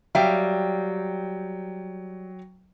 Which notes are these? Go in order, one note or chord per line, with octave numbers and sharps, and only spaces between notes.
F#3 G3 E5 F5 G5